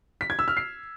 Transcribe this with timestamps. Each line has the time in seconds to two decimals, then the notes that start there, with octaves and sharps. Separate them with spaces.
0.21 B6
0.30 G#6
0.39 E6
0.48 F6
0.57 C7